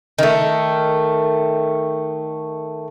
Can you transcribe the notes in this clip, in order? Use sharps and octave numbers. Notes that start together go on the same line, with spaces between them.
D#3 A3